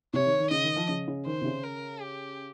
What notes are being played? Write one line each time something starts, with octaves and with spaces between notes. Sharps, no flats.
C3 C#5
D#3
D#3
C#3 D#5
D#3
F3
C#3
C#3
D#3 C5
C3
C#3
A#4
G4